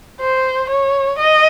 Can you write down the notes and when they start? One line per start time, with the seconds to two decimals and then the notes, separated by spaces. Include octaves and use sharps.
0.21 C5
0.69 C#5
1.18 D#5